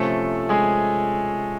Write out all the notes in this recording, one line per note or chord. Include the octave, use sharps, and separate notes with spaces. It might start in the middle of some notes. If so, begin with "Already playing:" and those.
Already playing: C3 F3 A3 C#4 A4
G#3 G#4